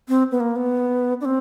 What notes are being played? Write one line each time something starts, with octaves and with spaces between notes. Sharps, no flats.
C4
B3
A#3
B3
D4
C4